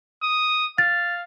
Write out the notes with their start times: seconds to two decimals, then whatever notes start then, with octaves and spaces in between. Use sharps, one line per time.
0.22 D#6
0.78 F5 A6